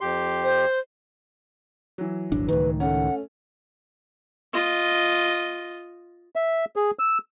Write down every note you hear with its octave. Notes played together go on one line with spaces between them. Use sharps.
F2 G4 C6
C5
E3 F#3
D#1 G#1 D4
C#2 A2 D#3 B4
A3 C#4 F#5
F4 D#5
E5
G#4
E6